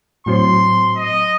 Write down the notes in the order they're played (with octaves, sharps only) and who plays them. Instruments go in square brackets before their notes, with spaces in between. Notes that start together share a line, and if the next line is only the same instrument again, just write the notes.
[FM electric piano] A2 F#3 C4 [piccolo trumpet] C6
[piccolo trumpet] D#5